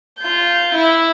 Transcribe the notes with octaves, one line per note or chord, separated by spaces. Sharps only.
F4 G6
E4